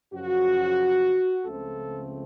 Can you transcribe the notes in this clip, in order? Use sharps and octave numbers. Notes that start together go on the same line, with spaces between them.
F#2 C#3 F3 F#4
C#2 C#3 F3 A3 C4 A4